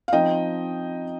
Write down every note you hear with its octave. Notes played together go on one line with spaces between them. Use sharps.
F5
F3 C4 D#4 D#5 G5